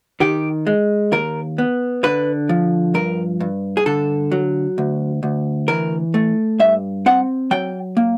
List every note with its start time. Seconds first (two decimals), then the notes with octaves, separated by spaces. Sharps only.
0.20 D#3 G4
0.67 G#3
1.12 D#2 A#4
1.58 B3
2.03 D3 B4
2.49 F3
2.94 G2 A#4
3.40 G2
3.77 G#4
3.86 D3 A4
4.32 F#3
4.78 D2
5.23 D2
5.68 E3 A#4
6.14 A3
6.60 G2 E5
7.06 C4 F#5
7.51 F#3 G5
7.97 A#3